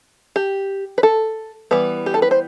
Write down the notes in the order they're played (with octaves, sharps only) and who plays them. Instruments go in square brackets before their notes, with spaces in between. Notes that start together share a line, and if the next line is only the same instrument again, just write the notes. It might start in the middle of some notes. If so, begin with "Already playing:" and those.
[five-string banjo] G4
B4
A4
E3 G3 B3 B4
G4
A4
B4
C5